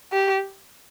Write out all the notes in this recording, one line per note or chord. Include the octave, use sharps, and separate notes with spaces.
G4